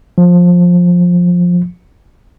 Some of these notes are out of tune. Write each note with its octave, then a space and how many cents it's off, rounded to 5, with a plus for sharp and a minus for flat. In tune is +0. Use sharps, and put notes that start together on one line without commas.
F3 +15